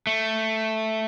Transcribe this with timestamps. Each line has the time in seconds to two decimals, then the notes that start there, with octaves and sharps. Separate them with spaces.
0.07 A3